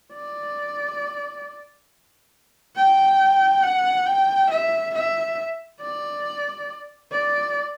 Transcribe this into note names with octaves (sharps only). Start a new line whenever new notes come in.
D5
G5
F#5
G5
E5
E5
D5
D5